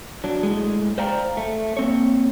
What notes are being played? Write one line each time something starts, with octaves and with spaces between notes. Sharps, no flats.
F#3 D4
A2 G#3
C5 D5 F5 G5 A#5
A3
A#3 C4 C#5